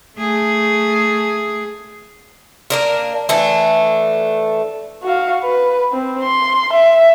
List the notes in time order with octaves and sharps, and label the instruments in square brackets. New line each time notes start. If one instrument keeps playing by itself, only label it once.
[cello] A3 G#4
[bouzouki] A#3 D4 A#4
E3 A3 D4
[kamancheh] F#4 F5
B4
C4
C6
E5